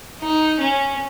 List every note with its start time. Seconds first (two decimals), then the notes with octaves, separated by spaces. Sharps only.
0.21 D#4
0.60 C#4